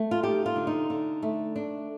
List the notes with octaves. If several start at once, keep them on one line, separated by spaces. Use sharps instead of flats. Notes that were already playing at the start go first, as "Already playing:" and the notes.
Already playing: A3
F4
D#4 G4
F4
D3
D#4
D3
A3
D4